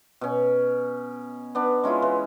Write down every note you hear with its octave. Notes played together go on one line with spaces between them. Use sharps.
B2 C#4
B3 D4
G#3 C#4 E4 F4
E3